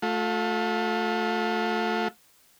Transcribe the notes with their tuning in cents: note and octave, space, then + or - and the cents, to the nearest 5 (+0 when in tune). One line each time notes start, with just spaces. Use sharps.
A3 +0 F4 +35